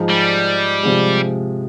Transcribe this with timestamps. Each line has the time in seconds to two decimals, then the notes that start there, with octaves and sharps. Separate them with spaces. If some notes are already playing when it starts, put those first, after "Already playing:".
Already playing: G#2 F3 G#3 D#4
0.10 G3
0.83 C3 F3 G#3